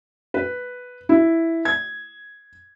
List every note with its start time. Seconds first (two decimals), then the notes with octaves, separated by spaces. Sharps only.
0.34 B4
1.09 E4
1.65 G#6